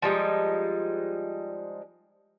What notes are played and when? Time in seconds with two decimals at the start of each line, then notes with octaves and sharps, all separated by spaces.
0.02 F3 G3 G#3 D#4